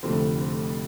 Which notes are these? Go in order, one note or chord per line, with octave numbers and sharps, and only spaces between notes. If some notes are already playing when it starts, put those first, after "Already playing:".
F1 F2 D3 A3 C4
C4